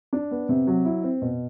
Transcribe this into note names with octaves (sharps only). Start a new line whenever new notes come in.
D4
B3
C3
F#3
E4
C4
B2